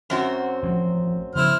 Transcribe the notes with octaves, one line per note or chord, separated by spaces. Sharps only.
F#2 C4 F#4
A1 F3 F#3
C#3 F3 B3 E4 C5 F6